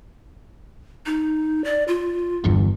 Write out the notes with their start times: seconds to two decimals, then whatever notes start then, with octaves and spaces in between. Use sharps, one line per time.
1.06 D#4
1.64 D5
1.88 F4
2.44 G1 E2 G2